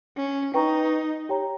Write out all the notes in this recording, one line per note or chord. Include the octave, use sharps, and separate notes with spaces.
C#4
D#4 B4 G5 A#5 C#6
G4 C#5 G5 A#5